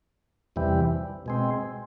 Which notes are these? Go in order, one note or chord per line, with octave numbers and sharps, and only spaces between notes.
E2 C3 E3 G3
B2 G#3 C4